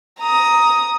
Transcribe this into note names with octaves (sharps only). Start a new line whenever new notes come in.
A#5 D#6